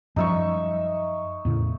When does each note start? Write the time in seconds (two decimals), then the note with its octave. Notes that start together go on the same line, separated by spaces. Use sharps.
0.16 F#2 F3 G3 D#4 E5 C#6
1.45 E2 A2 C#3